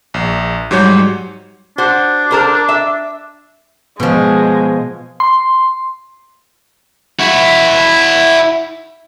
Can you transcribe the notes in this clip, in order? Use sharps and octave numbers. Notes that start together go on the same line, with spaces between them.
A#1
G#2 F#3 G3 C#5 G6
D4 F#4 C5
A4 A#4 C5
E5
B2 F3 G#3
C6
E4 F#4